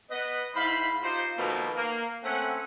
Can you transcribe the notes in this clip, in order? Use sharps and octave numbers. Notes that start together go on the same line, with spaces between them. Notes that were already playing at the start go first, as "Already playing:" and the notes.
B3 B4 D#5
G#2 E4 C5 F5 B5
D#4 F4 G4 C5
B2 D#3 F3 A3 A#3 D#4
A#3
A3 C4 C#4 E5 F#5